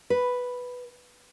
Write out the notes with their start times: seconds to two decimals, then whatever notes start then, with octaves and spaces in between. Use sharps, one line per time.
0.10 B4